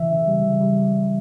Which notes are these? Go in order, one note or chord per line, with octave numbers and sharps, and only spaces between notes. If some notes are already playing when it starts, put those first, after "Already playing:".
Already playing: C#3 E3 E5
C#3
G3
C#3
G3